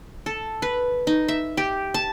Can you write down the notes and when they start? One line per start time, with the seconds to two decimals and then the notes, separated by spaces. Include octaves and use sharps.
0.26 A4
0.62 B4
1.07 D#4
1.28 E5
1.57 G4
1.94 A5